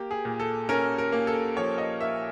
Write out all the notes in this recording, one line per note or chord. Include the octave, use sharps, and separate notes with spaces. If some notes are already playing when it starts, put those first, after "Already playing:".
Already playing: A#3 G4
G#4
A#2
A4
C#4 A#4
A#4
A#3
A4
F3 C#5
D#5
A#3 E5